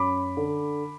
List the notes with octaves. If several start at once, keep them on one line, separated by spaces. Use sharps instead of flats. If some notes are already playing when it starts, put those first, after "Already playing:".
Already playing: F#2 B5 D6
D3